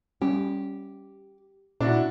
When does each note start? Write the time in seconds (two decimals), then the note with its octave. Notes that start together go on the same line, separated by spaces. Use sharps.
0.22 G3 C#4 G4
1.80 A#2 D4 E4 F#4